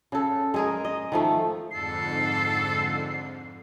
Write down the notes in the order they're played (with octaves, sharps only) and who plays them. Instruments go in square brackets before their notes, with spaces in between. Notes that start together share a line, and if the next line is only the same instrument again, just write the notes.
[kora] C#3 A4
G#3 G#4 A#4
D#5
D#3 F3 A3
[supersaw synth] F2 G#2 D3 [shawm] A4 [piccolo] C7